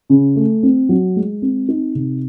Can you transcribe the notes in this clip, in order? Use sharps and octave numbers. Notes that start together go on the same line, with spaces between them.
C#3
A3
C4
F#3
G#3
C4
D#4
C3